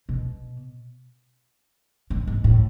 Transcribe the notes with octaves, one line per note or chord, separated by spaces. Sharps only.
B2
G#2
G#2
A2